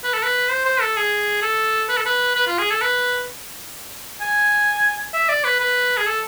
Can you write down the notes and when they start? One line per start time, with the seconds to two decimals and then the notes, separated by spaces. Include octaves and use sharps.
0.04 B4
0.14 A4
0.23 B4
0.50 C5
0.66 C5
0.81 A4
0.96 G#4
1.42 A4
1.89 B4
1.97 A4
2.06 B4
2.35 B4
2.47 F4
2.59 G#4
2.70 A4
2.82 B4
4.21 G#5
5.13 E5
5.29 D5
5.44 B4
5.60 B4
5.97 G#4
6.06 A4